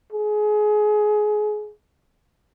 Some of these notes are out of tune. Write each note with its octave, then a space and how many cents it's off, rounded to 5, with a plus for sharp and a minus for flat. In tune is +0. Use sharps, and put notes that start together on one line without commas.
G#4 +25